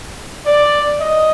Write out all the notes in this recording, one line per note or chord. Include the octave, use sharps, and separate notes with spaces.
D5
D#5